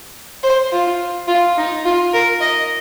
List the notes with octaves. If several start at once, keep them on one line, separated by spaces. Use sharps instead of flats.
C5
F4
F4
D#4
F4
A#4
D#5